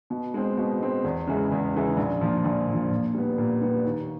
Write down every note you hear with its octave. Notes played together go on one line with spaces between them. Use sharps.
B2
G#3 C4
B2
G#3 C4
E2
C#3 E3 G#3
E2
C#3 E3 G#3
A#1
A#2 F3
A#1
A#2 F3
A#2
G3 B3
A#2
G3 B3
D#2